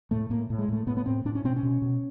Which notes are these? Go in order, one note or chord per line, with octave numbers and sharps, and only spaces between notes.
A2 A3
A2 A#3
A2
G#3
A2 A3
A2 B3
B3
A2 C4
A2 D4
C#4
B2 C4
C#4
B2
B2